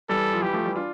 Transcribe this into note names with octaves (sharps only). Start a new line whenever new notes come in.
E3 G3 A4
F3
E3 G3 G4
F3 A3
E3 G3
D4 F4